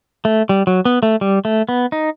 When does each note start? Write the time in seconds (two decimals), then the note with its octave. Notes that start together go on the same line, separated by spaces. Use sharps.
0.25 A3
0.49 G3
0.67 F#3
0.85 B3
1.03 A3
1.21 G3
1.45 A3
1.69 B3
1.92 D#4